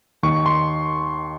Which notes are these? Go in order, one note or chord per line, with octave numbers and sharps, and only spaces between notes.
D#2 D#3 C#6
C6